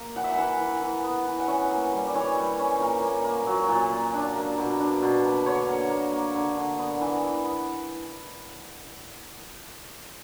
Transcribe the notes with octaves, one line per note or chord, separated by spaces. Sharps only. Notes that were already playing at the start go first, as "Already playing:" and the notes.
Already playing: A#3
E3 F#5
E5
F#5
E3
E3
E3
B3
E3
F#5
C#4 E5
A#3
G3
D5
E3 C#5
G3
C#4
A#2 A#4
A#3
A#3
F#3
A#2
A#3
D4
A#3
B2
D4
B2
A#3
D3 C#5
A#3
A#3
A#3
D3
D3
B3
E3
E3
B3